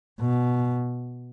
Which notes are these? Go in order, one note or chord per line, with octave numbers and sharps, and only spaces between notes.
B2